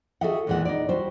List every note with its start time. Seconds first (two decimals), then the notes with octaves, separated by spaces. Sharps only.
0.21 F#4 G#4 A4 D#5 E5 F#5
0.47 E2 A#2 E3 G#3 F#5
0.65 D#4 D5
0.89 G3 F#4 C5